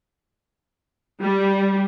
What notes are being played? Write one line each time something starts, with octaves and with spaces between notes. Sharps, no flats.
G3